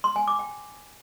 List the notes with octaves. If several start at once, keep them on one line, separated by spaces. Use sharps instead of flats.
C6
G#5
D6
G5